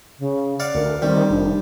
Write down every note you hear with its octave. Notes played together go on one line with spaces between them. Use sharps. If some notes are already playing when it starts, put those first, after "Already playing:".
C#3
D5 F5 F#5
D2 A#4
D#3 G3 C4
F1 D4